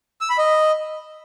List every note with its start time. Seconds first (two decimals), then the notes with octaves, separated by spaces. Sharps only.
0.21 E6
0.30 B5
0.38 D#5